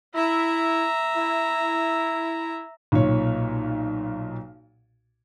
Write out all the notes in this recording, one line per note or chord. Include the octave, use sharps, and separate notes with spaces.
E4 E5 A#5
E4
B1 A#2 C#5